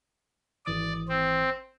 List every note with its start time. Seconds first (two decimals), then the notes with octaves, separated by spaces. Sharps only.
0.66 G#1 E3 D5 D#6
1.09 C4